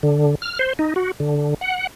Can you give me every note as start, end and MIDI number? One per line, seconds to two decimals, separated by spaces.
0.03 0.35 50
0.42 0.59 89
0.59 0.73 72
0.79 0.94 63
0.96 1.12 66
1.20 1.54 50
1.61 1.87 78